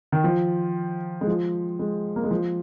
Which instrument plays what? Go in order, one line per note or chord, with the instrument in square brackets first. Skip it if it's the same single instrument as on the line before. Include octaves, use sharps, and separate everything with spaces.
[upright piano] D#3
F3
G#3
F3
G#3
A#3
G#3
F3